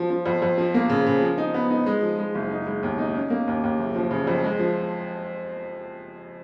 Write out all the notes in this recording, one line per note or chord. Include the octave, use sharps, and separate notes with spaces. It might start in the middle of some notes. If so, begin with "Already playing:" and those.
Already playing: F3
F3
F2
F2
F3
A#3
C#3
C#3
F3
D#4
B3
D#4
G#3
F3
G#3
F#1
D#4
G#3
D#2
D#4
C#4
A#3
D#2
D#2
F#1
F3
C#3
F2
G#3
F3